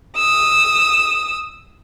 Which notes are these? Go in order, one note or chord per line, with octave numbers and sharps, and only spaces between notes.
D#6 E6